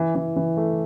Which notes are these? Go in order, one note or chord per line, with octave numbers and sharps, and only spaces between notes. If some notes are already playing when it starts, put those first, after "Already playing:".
Already playing: E3
E3
E3
A3